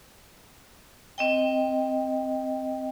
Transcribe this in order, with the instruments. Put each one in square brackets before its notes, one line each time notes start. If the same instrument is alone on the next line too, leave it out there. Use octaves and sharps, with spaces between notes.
[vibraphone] C4 D#5 G5